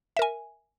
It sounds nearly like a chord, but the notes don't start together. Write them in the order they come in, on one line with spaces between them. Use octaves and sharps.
E5 A#4 G#5